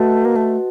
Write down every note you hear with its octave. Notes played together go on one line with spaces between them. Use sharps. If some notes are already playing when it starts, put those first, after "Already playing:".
Already playing: A3 F#4 B4 D#5 F#5 A5
A#3
A3